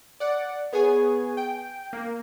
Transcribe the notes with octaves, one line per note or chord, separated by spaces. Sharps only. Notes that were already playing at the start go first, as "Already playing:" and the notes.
D5 F#5
B3 G#4 C#5 G#5
G5
A#3